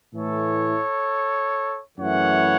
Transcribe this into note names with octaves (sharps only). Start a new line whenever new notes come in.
A2 E3 A3 E4 A4 C#5
F#2 E3 A3 E4 C#5 F#5